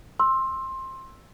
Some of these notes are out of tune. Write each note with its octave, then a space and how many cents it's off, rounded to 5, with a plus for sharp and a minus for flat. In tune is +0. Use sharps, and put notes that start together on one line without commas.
C6 +15 E6 +0